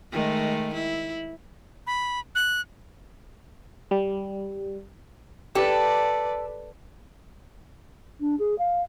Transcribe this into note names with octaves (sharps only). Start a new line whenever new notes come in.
D#3 G#3 A3
E4
B5
F#6
G3
G4 A4 B4 D5
D4
G#4
F5